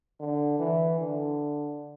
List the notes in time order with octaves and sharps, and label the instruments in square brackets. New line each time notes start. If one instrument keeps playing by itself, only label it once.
[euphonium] D3
E3
D3